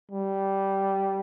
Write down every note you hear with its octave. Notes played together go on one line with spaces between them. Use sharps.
G3